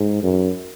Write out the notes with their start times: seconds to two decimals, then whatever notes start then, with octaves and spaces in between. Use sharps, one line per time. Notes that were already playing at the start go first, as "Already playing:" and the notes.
Already playing: G#2
0.23 F#2